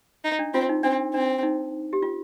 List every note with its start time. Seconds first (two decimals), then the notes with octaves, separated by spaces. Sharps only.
0.24 D#4
0.39 D4
0.54 C4 F4
0.69 D#4
0.83 C4 D4
1.13 C4 D4
1.43 D#4
1.93 G4
2.02 F4